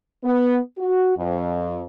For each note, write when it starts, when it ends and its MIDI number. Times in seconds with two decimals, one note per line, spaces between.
0.24 0.58 59
0.78 1.14 66
1.17 1.85 41